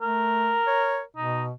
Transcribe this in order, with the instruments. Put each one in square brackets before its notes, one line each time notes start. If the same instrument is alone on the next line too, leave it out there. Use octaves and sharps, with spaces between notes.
[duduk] A3 [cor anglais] A#4
[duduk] C#5
[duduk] B2 [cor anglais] D#4